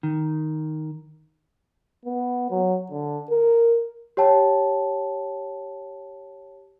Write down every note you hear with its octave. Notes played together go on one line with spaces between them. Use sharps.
D#3
B3
F#3
D3
A#4
G4 C#5 G5 A5